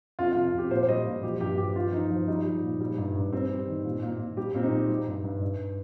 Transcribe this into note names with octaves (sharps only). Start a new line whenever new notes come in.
F2 F4
F4
C3
F2 G4
A#2 C5
C5
G3 D#5
A#2
F3 G4
G2 G4
F3 G4
F3 F4
F3 D#4
F3
G3 D#4
G3
A#2
G3
G2
G2
G3 C4
G3
D#3
A#2
A#2
A#2
G3 G4
A#2 C4
D#4
G3
G3
G2
G2
G2